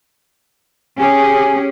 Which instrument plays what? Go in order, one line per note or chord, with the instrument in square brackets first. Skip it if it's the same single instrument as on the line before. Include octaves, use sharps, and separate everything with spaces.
[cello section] C#4 G4 G#4 [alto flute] G#5